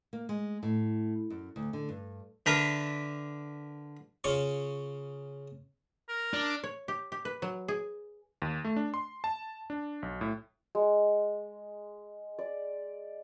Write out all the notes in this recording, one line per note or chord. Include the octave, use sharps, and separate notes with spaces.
A#3
G#3
A2
F#2
D2
D3
G2
D3 D4 A#4 B4 E5
C#3 C#4 F4 C#6
A#4
D4
C#5
G4
G4
B4
F#3
G#4
D#2
A3
D4
C6
A5
D4
B1
A2
G#3
D5